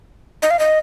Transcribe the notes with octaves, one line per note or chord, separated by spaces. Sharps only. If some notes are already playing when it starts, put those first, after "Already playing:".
D#5
F5
D#5